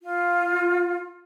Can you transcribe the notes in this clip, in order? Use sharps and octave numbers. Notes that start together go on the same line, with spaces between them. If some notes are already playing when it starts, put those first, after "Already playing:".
F4